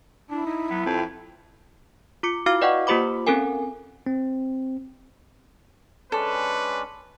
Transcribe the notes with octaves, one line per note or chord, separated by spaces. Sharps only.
D4 E4
D#4
F#3 B3
F2 C4
F4 D6 C#7
E4 F#4 F5 D6 F6
B4 D5 D#5 F#5 G5 C#6
A#3 F4 G4 C5 B5 D6
C4 C#4 A4 A#4 G#5
C4
G#3 C#4 D4 A4 B4